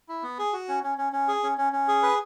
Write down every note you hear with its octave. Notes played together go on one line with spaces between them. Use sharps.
E4
B3
G#4
F#4
C#4
C#4
C#4
C#4
G#4
C#4
C#4
C#4
G#4
B4